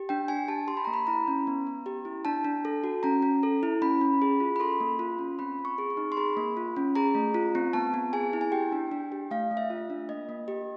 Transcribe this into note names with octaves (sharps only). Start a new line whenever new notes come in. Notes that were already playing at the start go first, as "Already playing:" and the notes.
Already playing: G4
D4 G5
D4 G#5
G4 A5
G4 C6
B5
A#3 A#5
B5
E4 A#5
C#4
B3
B3
G4
E4
D4 A5
D4
A4
F#4
C#4 A#5
C#4
A4
E4
C#4 B5
C#4
G#4
F4
B5
A4 C6
A#3
F4
C#4
C4 B5
C4
C#6
G#4
C#6
D#4
C6
G#4 B5
A#3
F4
C#4
G#4 A#5
A3
F4
C4
B3 A5
B3
G#4 G#5
E4
G#5
G4 G5
D4
D4
G4
A3 F5
A3
E5
F4
D4
A#3 D#5
A#3
G4